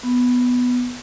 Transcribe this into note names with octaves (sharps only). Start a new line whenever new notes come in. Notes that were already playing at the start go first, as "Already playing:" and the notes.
B3